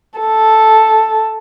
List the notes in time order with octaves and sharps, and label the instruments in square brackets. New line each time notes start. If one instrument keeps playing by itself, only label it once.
[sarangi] A4